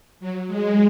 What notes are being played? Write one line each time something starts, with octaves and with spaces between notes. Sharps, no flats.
F#3
G#3